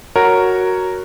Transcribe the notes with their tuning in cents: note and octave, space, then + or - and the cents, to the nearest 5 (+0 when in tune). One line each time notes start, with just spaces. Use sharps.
F#4 +0 A#4 -5 C#5 +0